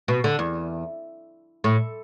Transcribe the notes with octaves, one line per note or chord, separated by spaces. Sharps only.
B2
D3
E2
A2